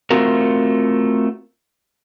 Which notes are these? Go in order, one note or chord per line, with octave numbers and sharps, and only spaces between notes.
A3 C4 F4 F#4 A#4